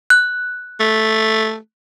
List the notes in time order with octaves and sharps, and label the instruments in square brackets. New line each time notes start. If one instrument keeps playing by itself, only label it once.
[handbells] F#6
[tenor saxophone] A3